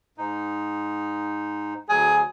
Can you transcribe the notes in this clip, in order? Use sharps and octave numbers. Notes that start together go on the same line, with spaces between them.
G#2 D#4
D2 F#3 G#4